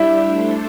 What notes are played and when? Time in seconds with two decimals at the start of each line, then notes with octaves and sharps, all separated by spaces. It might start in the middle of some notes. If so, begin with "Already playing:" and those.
Already playing: G3 D4 E4 G4 E5
0.24 A3 D4 A4 C5